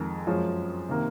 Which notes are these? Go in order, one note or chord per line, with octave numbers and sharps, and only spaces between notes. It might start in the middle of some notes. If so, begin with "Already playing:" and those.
Already playing: F2 D#3 G#3
F#2 F3 G#3 C#4
C3 D#3 A#3